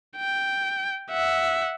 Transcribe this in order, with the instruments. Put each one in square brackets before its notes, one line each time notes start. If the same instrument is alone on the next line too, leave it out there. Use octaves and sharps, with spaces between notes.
[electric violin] G5
E5 F#5